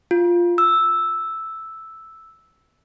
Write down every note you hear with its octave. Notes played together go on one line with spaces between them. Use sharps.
F4
E6